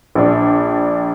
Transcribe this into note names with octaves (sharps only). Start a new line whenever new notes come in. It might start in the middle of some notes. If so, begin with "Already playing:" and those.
A#1 D4